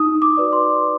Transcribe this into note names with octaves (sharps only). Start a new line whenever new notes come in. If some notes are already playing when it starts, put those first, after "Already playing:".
Already playing: D#4 D#6
D6
F#4 B4 D5
C6